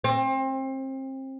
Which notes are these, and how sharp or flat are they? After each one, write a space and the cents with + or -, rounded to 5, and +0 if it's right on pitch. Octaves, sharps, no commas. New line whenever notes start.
C4 +30